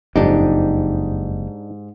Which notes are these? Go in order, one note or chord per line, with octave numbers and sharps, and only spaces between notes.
F#1 F2 G#2 D4 D#4 G4